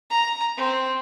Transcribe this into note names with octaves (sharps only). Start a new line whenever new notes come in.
A#5
C4